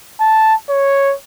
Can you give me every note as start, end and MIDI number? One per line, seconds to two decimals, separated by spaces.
0.20 0.55 81
0.69 1.14 73